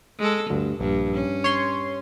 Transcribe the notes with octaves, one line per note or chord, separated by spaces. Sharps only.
G#3 A4
D2 G2
A#1 G2
C#4
C#5 C6